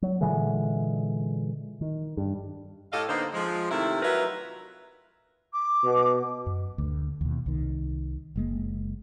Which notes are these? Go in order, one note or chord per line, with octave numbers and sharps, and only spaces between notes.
F#3
A#2 D3 E3 G#3
D#3
G2
A2 G4 A4 D#5 F5
D3 A#3 B3 D#4 C5
F3 G#3
C3 D#3 A3 E4
F#3 D#4 F4 A#4 B4 E5
D6
B2
F#2
D2 A3
D#2 B2
C2 D#3
F#1 G#3 A#3